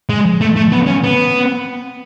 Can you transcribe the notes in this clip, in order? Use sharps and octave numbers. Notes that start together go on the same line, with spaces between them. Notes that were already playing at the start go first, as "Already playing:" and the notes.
G#3
A3
A3
B3
C#4
B3